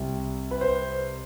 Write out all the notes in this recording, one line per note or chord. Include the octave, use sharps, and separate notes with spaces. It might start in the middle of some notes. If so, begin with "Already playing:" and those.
Already playing: C2 C3 G3
B4
C5